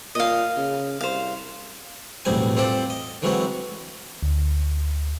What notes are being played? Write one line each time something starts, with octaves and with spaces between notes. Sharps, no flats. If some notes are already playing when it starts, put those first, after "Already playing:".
A#2 D#5 F5
C#3
C2 C5 F5
B1 E2 A2 G3 C4 G#5
C4 F4 G4 A4 C5 D5
D#5
D3 E3 F#3 G#3 C4 C#5
D2